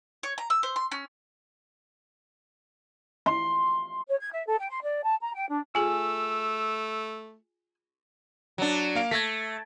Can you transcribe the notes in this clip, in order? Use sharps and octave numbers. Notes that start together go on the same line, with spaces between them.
C#5
A#5
E6
C5
C6
C#4
C6
C#5
G#6
E5
A4
G5
C6
D5
A5
A#5
G5
D4
A3 F4 G#4 G#5 E6
F#3 D4
A#3 F5 D7
A3 G#6 A#6 B6